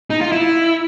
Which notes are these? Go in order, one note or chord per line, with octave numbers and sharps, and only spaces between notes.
D#4
F4
E4